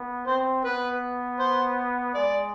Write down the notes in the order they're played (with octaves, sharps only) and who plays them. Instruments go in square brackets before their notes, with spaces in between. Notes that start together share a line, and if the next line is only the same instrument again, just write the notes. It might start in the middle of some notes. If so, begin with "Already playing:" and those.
Already playing: [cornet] B3
[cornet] C4 [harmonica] C5
[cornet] B3 [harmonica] B4
[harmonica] C5
[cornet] G#3 [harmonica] D5